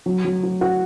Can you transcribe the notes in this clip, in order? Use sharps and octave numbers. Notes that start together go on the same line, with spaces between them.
F#3
F#3
F#4
F#4